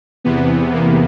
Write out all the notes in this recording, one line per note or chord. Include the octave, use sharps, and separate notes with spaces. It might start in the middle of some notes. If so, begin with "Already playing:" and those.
E2 C3 E3 B3
A#3